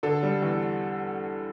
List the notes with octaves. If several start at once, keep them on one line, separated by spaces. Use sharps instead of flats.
D3 A4
G3
E2